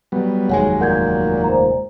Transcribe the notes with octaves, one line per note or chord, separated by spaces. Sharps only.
F#3 G3 B3
F1 D#2 F#3 G#3 C#5 F#5 G#5
A#2 F#5 G6 G#6
C5 A#5